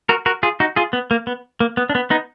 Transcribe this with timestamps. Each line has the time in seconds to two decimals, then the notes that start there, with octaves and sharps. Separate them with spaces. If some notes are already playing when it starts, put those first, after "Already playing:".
0.09 F#4 A#4
0.26 F#4 A#4
0.43 F4 G#4
0.60 D#4 F#4
0.76 F4 G#4
0.93 B3
1.11 A#3
1.27 B3
1.60 A#3
1.77 B3
1.90 D4
1.95 B3
2.10 B3 D#4